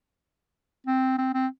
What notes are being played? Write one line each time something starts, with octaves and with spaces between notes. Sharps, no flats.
C4
C4
C4